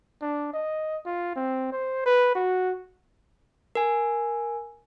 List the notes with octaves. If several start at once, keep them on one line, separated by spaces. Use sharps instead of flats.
D4
D#5
F4
C4
C5
B4
F#4
A#4 G#5